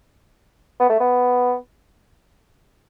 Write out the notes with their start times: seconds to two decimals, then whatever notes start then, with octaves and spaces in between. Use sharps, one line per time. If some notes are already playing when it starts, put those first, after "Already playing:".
0.80 B3
0.90 A3
1.00 B3